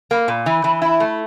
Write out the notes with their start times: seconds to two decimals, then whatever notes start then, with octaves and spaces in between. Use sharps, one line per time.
0.11 A#3
0.28 A#2
0.46 E3
0.64 E3
0.82 E4
1.00 A3